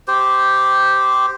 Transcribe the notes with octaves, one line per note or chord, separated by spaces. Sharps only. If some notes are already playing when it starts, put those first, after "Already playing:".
G4 C5